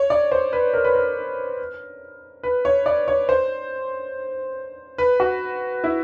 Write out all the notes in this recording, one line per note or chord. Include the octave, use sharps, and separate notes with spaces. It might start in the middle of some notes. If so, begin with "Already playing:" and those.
Already playing: C#5
D5
C5
B4
A#4
B4
A#4
B4
C#5
D5
C#5
C5
B4
F#4
E4